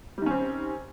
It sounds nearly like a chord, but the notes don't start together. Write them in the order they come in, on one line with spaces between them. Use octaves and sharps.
G3 D#3 C#4 C4